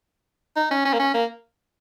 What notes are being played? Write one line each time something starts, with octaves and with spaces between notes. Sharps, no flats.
D#4
C#4
C#4
A#3
C#4
A#3